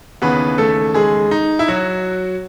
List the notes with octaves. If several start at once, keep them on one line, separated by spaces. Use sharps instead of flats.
D#2 C#3 E3 B3 B4
A3 A4
G#3 G#4
D#4
E4
F#3 F#4